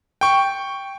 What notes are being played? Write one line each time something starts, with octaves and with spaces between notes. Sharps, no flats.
G5 C#6